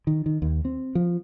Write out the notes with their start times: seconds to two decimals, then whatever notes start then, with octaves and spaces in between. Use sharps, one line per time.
0.07 D#3
0.26 D#3
0.42 D#2
0.65 C4
0.95 F3